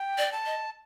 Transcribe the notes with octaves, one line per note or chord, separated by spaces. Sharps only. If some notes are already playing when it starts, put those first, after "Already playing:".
Already playing: G5
D5
A5
D#5